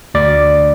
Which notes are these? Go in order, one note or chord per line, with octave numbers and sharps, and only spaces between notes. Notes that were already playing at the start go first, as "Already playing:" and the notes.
D2 D5